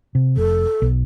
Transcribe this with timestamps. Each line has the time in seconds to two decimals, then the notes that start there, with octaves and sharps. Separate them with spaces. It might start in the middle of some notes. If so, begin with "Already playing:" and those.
0.15 C3
0.37 F1 A4
0.82 B1